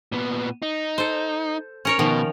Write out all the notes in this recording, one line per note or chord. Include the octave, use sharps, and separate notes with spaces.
A#2 B3
D#4
A4 C5
C#4 A#4 C#5
B2 D#3 F3